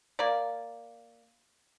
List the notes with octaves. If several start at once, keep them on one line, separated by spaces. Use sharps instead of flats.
A#3 D5